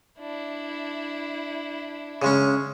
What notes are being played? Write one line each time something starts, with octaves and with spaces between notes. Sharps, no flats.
D4 E4
C#3 G#3 C#4